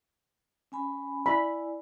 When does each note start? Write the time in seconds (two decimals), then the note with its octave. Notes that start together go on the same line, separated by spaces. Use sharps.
0.72 C#4 G#5 B5
1.26 E4 D5 G#5 B5